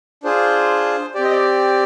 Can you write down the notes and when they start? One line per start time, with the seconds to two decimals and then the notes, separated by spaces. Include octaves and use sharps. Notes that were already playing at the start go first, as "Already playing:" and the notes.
0.23 D4 F4 G#4 C5
1.15 C4 G4 D5
1.24 D#5
1.31 D5